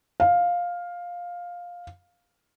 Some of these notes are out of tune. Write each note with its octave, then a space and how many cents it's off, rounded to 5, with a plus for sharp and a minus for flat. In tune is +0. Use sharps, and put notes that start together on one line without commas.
F5 +10